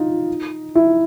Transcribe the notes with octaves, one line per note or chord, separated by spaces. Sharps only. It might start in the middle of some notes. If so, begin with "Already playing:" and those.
Already playing: D#4 F4
E4